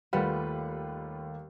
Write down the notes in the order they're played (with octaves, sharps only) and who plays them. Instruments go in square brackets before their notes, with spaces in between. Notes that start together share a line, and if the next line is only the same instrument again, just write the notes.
[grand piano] D#2 A3 [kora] G3 [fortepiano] F4 B4 F#5